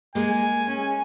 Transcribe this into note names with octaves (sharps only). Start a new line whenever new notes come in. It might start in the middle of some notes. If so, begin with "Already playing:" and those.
G#3 A#3 G#5
C#4